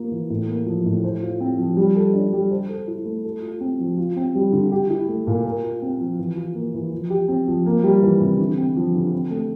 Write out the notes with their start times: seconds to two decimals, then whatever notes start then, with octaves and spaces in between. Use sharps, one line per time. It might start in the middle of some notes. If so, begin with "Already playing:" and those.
Already playing: A#3 F4
0.11 E3
0.30 A2
0.48 A#3
0.66 F3
0.86 A2
1.04 C5
1.22 F4
1.40 C4
1.59 F3
1.77 G3
1.96 A4
2.13 D4
2.33 G3
2.51 C5
2.69 A4
2.88 E4
3.05 A3
3.25 A4
3.42 F4
3.60 C4
3.79 F3
3.97 F4
4.16 C4
4.35 G3
4.52 D3
4.72 G4
4.90 E4
5.08 A3
5.27 A#2
5.45 A#4
5.63 F4
5.82 C4
6.00 F3
6.19 E3
6.36 F4
6.55 A#3
6.74 E3
6.92 F3
7.10 G4
7.28 C4
7.48 F3
7.66 A#3
7.83 G3
8.02 E3
8.21 C3
8.39 D3
8.58 C4
8.76 F3
8.95 D3
9.12 C4
9.31 A3